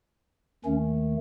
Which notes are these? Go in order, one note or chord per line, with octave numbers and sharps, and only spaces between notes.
D#2 D#3 A3 C#4